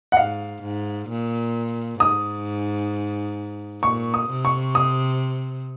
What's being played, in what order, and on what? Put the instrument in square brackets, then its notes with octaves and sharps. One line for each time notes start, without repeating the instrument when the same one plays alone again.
[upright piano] F#5
[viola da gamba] G#2 [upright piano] F5
[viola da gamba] G#2
A#2
[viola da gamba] G#2 [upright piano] D#6
[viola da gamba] A#2 [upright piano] C#6
[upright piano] D#6
[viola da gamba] C3
[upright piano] C#6
D#6